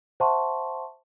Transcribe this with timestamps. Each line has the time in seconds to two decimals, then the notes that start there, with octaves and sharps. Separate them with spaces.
0.20 C5 E5 F#5 A5 C6 C#6